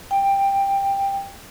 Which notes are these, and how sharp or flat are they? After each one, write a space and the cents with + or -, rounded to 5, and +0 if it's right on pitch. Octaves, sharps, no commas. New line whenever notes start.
G5 +10